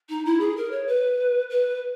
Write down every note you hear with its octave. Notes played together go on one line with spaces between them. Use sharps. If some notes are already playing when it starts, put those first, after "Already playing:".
D#4
E4
G#4
A#4
C#5
B4
B4